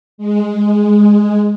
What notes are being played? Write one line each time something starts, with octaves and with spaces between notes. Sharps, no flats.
G#3